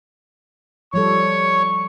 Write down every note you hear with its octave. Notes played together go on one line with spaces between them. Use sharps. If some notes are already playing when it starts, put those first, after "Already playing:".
F3 G3 A4 C#5 C#6